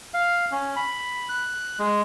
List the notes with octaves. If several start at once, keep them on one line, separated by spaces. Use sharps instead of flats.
F5
C#4
B5
F#6
G#3